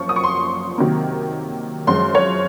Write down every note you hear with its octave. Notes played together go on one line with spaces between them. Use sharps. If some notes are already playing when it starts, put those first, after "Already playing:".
Already playing: F#2 F3 A#3 C#6
D#6
C#6
C6
C3 D#3 F#3 A#3
F#2 F3 G#3 C6
C#5